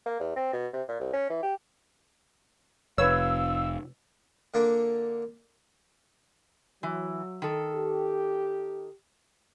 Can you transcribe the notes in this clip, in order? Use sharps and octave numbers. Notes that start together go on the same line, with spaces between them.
A#3
E2
C4
B2
C3
A#2
C2
C#4
E3
G4
F1 B4 C#5 F5 E6
D3 A#3 D4
E3 F#3
D#3 A4
G4